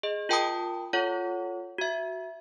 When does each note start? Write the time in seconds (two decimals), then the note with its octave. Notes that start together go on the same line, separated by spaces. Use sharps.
0.03 G#4 D#5
0.29 F4 A#4 G5 A5 B5 D#6
0.93 F4 A4 C#5 F#5
1.78 F#4 E5